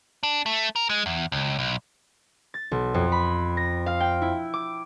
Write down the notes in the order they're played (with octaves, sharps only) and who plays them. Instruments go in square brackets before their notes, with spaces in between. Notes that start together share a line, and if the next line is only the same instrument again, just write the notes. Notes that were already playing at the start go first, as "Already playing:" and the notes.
[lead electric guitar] D4
A3
A#4
G#3
E2
C#2
B1
[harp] A6
B1
F2
B5
A#6
F5
G5
E4
D6